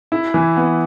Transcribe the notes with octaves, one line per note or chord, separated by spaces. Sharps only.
E4
E3
B3